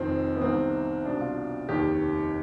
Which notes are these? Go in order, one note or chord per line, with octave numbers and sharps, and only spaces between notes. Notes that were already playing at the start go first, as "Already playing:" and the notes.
Already playing: F1 F2 D#3 C4
B3
C2 C3 D#3 C4
C2 B2 D4
F4
F1 D#2 D#3 G4